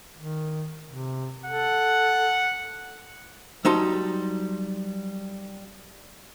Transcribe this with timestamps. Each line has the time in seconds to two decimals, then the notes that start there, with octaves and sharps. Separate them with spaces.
0.17 D#3
0.88 C3
1.46 A4 F#5
3.65 F#3 G3 D#4 A5 A#5 C6